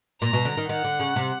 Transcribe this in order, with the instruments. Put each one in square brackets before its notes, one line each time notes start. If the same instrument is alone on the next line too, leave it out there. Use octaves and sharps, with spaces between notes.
[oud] A#2 [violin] A#5
[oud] B2
D3
D#3
[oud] D#3 [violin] F#5
[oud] D3
C#3
C3